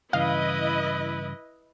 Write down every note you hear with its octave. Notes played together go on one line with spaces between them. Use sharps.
G2 C#3 E3 E4 B4 D#5 F5